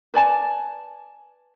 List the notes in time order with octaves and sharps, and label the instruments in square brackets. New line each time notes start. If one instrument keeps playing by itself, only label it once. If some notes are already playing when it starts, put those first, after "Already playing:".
[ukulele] B4 D5 G#5 A5